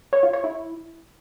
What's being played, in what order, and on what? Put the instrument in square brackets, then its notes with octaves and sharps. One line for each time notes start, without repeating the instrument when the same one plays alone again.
[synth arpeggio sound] C#5
F4
C#5
E4